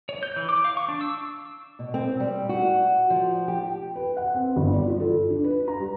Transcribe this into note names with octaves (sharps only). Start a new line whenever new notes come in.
C#5
G6
E3
D6
F5
C#6
D4
E6
B2
C4
G3
F#4
F3
G4
B4
F#5
C4
G1
D5
F3
A4
D4
B4
A#5
G3